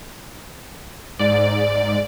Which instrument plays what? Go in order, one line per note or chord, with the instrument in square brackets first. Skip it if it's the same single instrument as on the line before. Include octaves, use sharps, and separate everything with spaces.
[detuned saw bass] G#2 [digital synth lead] D5